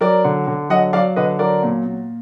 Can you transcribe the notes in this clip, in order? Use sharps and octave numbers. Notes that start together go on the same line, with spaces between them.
F#3 A#4 D5
D3
D3
F#3 D#5 F#5
F#3 D5 F5
D3 B4 D#5
F#3 A#4 D5
A#2
A#2